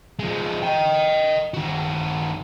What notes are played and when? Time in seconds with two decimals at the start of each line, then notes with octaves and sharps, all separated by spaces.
0.19 F3 G#3
0.62 D#5 G5
1.54 D#3 F#4